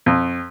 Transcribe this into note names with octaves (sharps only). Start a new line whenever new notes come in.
F2